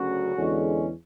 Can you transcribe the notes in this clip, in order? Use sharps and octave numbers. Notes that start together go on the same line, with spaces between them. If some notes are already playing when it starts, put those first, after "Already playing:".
Already playing: D2 C#3 F#3 C#4 F#4
E2 D3 G#3 C#4